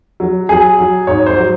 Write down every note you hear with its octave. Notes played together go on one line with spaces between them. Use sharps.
F#3
F#3 G#4
F#3
G#2 C#5
C5
F#3